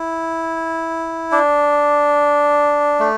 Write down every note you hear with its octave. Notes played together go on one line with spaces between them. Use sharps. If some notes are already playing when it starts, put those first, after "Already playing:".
Already playing: E4
D4
A3